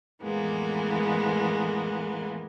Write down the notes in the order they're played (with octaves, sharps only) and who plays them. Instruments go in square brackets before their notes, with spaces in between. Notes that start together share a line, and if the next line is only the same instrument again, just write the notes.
[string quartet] F2 A2 E3 G#3 A#3 B3